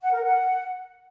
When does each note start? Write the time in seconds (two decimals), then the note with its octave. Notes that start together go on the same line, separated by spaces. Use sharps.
0.01 F#5
0.12 A#4
0.24 F#5